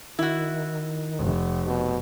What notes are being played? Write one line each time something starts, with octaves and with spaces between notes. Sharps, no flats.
D#3 E4 F#4
F1
B2